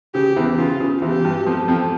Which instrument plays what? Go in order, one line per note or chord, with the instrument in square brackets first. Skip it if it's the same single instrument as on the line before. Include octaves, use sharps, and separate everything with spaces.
[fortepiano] C#3 [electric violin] G4
[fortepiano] E2 E3
[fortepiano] C#3 [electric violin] F4
[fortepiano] C#3
[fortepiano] E2 E3 [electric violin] G4
[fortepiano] G2 G3
F2 F3
F2 F3